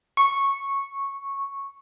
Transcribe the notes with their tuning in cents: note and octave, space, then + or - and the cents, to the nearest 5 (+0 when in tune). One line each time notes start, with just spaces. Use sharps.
C#6 -10